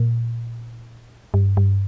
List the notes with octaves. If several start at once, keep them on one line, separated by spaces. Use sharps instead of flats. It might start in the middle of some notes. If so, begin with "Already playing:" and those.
Already playing: A#2
G2
G2